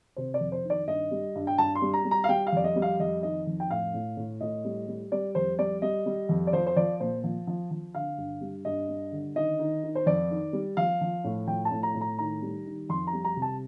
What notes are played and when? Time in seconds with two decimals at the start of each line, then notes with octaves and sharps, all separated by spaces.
0.16 C3 C5
0.34 D5
0.40 F2
0.52 C5
0.64 D#3
0.70 D5
0.87 G2 D#5
1.11 G3
1.35 G2
1.47 G5
1.58 G2 A5
1.75 C6
1.82 G3
1.94 A#5
2.05 G3
2.11 A#5
2.24 F5
2.29 G3 G5
2.47 F5
2.52 F2 D5
2.64 D#5
2.76 G3
2.82 F5
2.99 F2 D#5
3.23 D#3 D#5
3.47 F2
3.60 G5
3.70 A2 F5
3.94 A2
4.17 A2
4.41 A2 D#5
4.65 G3
4.88 G3
5.12 G3 D5
5.35 F2 C5
5.59 G3 D5
5.82 G3 D#5
6.06 G3
6.29 F2
6.47 D5
6.53 F3 C5
6.67 C5
6.76 F3 D5
7.00 A#2 C5
7.24 F3
7.47 F3
7.71 F3
7.95 D3 F5
8.18 G2
8.41 G3
8.65 G2 D#5
8.89 G3
9.12 D3
9.35 D#3 D#5
9.59 D#3
9.83 D#3
9.95 C5
10.06 F2 D5
10.30 D#3
10.53 G3
10.77 F3 F5
11.01 F3
11.24 A2
11.47 F3 G5
11.65 A5
11.71 A2
11.83 A#5
11.94 A2
12.01 A#5
12.18 D#3 A#5
12.42 G3
12.66 D#3
12.89 F2 C6
13.07 A#5
13.13 G3
13.25 A#5
13.36 C3
13.42 A5